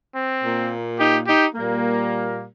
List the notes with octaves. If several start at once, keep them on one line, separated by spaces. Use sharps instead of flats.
C4
A#2 A#3
D#4 G4
D#4 G4
A#2 G3 A#3